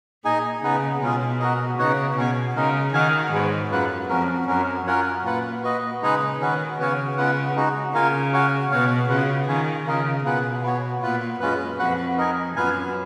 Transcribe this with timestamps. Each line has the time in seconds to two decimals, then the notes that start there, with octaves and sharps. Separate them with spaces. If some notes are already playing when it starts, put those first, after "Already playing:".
0.24 A#2 D#4 G#4 D#5 G#5
0.63 C#3 B3 D#4 G#4 B4
1.01 B2 G#3 C#4 F4 G#4
1.40 F#4 A#4 D#5
1.79 C#3 B3 D#4 F#4 C#5 F#5
2.17 B2 C#4 F#4 C#5 G#5
2.55 C#3 G#3 D#4 A#4
2.94 D#3 D#4 F#4 A#4 F5 G#5
3.32 G#2 G#3 B3 F#4 C#5
3.71 F#2 A#3 F4 B4 F#5
4.09 F2 C#4 F#4 A#4
4.47 F#2 C#4 F#4 A#4
4.86 F#2 C#4 F4 A#4 C#5 F#5
5.25 A#2 F4 B4 F#5
5.63 F#4 B4 D#5
6.02 C#3 G#3 D#4 G#4 B4
6.40 D#3 C#4 F#4 B4
6.79 C#3 B3 F#4 C#5 F5 G#5
7.17 C#3 G#3 B3 F4 B4 F#5
7.56 G#3 D#4 F#4
7.94 C#3 A#3 F4 A#4 F5 G#5
8.33 F#4 C#5 F5 G#5
8.71 B2 B3 F#4 C#5 F5
9.09 C#3 F4 B4 F#5
9.48 D#3 A#3 C#4 F4 G#4 C#5
9.87 C#3 A#3 F4 A#4 D#5
10.25 B2 A#3 F4 G#4 B4 F#5
10.63 B3 F#4 C#5
11.02 A#2 B3 F4 B4
11.40 F#2 G#3 C#4 F4 B4
11.79 F2 F#4 B4 F#5
12.17 D#4 A#4 D#5 G#5
12.56 F#2 B3 F4 B4 F5 G#5